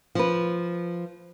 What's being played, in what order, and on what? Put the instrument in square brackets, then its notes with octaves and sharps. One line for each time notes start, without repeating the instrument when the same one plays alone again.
[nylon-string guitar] F3 B4